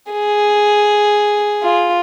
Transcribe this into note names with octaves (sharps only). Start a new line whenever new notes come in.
G#4
F4